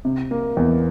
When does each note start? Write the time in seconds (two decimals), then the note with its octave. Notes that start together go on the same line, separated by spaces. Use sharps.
0.05 C3
0.31 A#3
0.57 E2